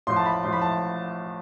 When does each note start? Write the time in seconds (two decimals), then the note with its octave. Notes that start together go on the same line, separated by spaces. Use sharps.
0.07 A1 A2 F3 C6
0.16 A5
0.26 B5
0.43 A1 A2 F3 C6
0.53 B5
0.61 A5